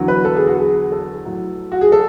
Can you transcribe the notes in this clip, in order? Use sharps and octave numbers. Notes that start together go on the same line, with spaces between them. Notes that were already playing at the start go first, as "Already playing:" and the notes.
Already playing: E2 D3 F#3
B4
A4
G#4
F#4
G#4
A4
A2 F#3
F#4
G#4
A4